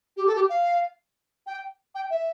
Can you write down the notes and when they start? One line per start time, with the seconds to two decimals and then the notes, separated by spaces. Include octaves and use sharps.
0.17 G4
0.27 A4
0.35 G4
0.49 F5
1.47 G5
1.95 G5
2.10 E5